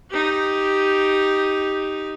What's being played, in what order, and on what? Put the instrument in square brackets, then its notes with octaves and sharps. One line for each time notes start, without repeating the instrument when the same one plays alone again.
[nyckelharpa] D#4 G4